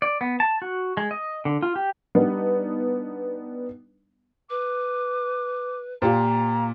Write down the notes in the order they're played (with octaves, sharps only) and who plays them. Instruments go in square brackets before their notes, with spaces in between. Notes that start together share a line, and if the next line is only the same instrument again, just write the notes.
[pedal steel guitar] D5
B3
A5
F#4
G#3
D#5
D3
F4
G4
[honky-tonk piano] G3 B3 D4 D#4
[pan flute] B4 [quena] D6
[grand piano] A#2 [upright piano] F4 G4 C5 [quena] A#5